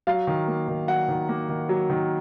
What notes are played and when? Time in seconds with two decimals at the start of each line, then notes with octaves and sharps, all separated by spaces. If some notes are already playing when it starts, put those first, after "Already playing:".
0.07 F#3 F5
0.27 D#3
0.48 A#3
0.68 D#3
0.88 F#3 F#5
1.08 D#3
1.29 A#3
1.49 D#3
1.69 F#3
1.90 D#3